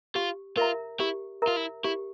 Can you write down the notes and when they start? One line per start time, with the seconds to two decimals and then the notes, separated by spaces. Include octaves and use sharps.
0.15 F4 G4
0.57 F4 A#4 E5 A#5
1.00 E4 G4
1.42 A#4 E5 A#5
1.47 F4
1.56 E4
1.84 E4 G4